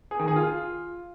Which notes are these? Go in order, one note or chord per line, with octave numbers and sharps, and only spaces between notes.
G#4
D#3
G#4
F4